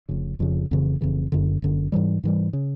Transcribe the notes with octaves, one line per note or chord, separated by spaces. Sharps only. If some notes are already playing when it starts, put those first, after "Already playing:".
F1 F2 C#3
F1 F2 C#3
F1 F2 C#3 E3
F1 F2 C#3 E3
F#1 F#2 D3
F#1 F#2 D3
G#2 E3 G3
G#2 E3 G3
C#3